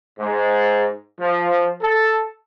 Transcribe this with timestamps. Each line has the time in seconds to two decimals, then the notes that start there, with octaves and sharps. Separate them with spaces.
0.19 G#2
1.20 F3
1.81 A4